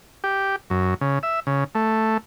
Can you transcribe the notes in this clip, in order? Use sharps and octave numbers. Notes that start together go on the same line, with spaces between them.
G4
F#2
C#3
E5
C#3
A3